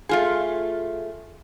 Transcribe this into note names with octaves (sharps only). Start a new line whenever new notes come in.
A3 F4 G#4